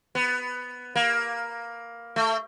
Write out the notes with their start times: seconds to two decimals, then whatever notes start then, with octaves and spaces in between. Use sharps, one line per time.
0.15 B3
0.96 A#3
2.16 A3